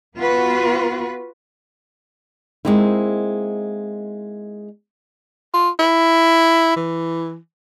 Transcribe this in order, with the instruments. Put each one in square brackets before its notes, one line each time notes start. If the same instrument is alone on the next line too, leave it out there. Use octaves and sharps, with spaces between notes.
[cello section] B3 F4 F#4 B4
[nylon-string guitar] G#3 A#3 C4 D#4 E4
[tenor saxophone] F4
E4
E3